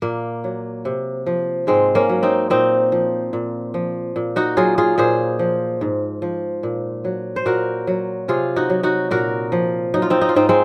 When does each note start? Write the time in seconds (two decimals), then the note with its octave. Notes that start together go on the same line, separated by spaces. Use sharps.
0.02 A#2 A#3
0.44 F#3
0.85 C3
1.26 F3
1.67 G#2 G#3 C4
1.95 A#3 C#4
2.09 F#3
2.23 C4 D#4
2.50 A#2 C4 D#4
2.92 F3
3.33 A#2
3.74 F3
4.16 A#2
4.36 D#4 F#4
4.57 F#3 F4 G#4
4.78 F4 G#4
4.98 A#2 G#4 C5
5.39 F3
5.81 G#2
6.22 F3
6.63 A#2
7.05 F#3
7.36 C5
7.45 A#2 F#4 A#4
7.87 F#3
8.28 C3 F4 G#4
8.56 D#4 F#4
8.70 F#3
8.83 D#4 F#4
9.11 A#2 F#4 A#4
9.52 F3
9.94 F#3 D#4
10.02 F4
10.10 C4 D#4
10.21 D#4
10.29 F4
10.35 G#2 C4 D#4
10.49 G#3 C4